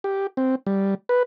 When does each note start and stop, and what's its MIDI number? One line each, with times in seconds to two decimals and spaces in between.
0.04 0.27 67
0.37 0.55 60
0.67 0.95 55
1.09 1.23 71